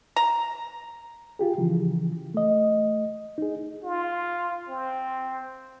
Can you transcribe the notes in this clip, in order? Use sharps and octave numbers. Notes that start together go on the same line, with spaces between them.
A#5
F4 G4 G#4
C#3 E3 F3
A3 D#5
D#4 G#4
F4
C4